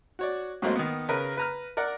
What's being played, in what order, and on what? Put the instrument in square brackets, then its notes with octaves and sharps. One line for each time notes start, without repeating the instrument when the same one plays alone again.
[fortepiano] F#4 C#5 D5
G#2 F#3 A3 A#3 C4 D#4
D#3 B3
C#3 A#4 B4
B4 A#5 F6
A#4 D5 F#5